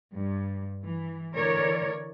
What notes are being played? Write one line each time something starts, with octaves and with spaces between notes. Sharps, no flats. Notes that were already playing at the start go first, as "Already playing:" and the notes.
G2
E3
D3 E3 A#4 C#5 D5